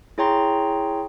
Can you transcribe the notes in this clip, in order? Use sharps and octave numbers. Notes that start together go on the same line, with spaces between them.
E4 G#4 C#5 G5 A#5 C6